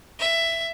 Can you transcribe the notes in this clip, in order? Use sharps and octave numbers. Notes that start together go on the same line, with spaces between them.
E5